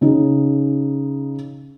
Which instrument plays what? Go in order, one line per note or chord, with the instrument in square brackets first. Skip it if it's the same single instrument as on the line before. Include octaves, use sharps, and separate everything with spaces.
[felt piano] C#3 D#4